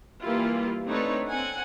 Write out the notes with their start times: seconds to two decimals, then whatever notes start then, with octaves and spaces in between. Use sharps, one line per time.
0.22 E3 G3 A#3 E4 F4 G4
0.88 A3 C4 D4 D#4 B4 C#5
1.27 C4 F#5 G#5